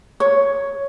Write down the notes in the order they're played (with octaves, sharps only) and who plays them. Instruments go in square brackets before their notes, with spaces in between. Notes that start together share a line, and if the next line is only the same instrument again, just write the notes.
[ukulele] C#5